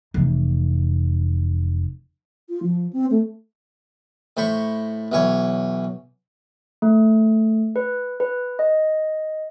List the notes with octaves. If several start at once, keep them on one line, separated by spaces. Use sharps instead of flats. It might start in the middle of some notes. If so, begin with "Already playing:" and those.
F1 E3
F4
F3
C4
A3
A2 C5 B5 C#6
B1 E3 C#5
A3
B4
B4
D#5